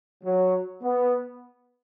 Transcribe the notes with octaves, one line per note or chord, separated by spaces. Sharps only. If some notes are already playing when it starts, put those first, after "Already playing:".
F#3
B3